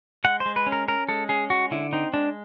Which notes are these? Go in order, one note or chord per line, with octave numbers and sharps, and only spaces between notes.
G#3 F#5
C5
G#3
B4
C#4
A#4
C#4 A#4
G#3 A4
C#4 G#4
G#3 F#4
D3 E4
C4 D#4
G#3 D4